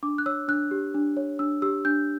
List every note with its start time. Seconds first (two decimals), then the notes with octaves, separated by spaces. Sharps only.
0.03 D4 D6
0.18 F#6
0.26 C#5 E6
0.48 D4 F#6
0.71 G4
0.94 D4
1.17 C#5
1.39 D4 E6
1.62 G4 E6
1.85 D4 G6